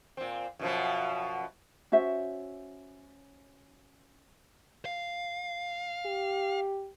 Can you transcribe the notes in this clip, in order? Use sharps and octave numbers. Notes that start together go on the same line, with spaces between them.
A#2 C4
F#2 B2 F3
C#4 F#4 C5 E5
F5
G4